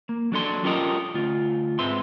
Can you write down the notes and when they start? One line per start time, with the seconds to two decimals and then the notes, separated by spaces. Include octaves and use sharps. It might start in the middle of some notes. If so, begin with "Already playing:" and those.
0.09 A#3
0.32 F#3 D4 A4 C6
0.64 C#4 F4 G4 A4 A#4 D#5
1.14 D2 F4
1.79 G#2 G#3 C4 B4 E5 C6